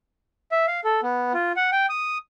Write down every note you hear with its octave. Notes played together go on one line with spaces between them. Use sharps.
E5
F5
A4
B3
F4
F#5
G5
D#6